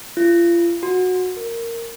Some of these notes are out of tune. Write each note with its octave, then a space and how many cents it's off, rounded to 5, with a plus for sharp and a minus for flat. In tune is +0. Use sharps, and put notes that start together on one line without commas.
F4 -35
F#4 -15
A#4 -10